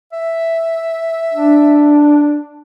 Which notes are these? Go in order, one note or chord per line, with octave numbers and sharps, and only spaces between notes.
E5
D4